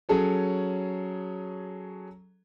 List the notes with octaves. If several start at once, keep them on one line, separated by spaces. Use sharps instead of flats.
F#3 C#4 G#4 A4 C#5